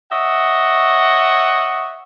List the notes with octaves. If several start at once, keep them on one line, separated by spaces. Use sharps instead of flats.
C#5 D#5 E5 F#5